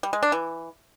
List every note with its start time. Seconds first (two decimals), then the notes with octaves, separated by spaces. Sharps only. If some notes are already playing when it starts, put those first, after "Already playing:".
0.03 G3
0.13 G#3
0.23 D4
0.32 E3